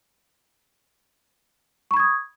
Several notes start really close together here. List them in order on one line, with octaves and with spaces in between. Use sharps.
C#6 B5 G#6 D#6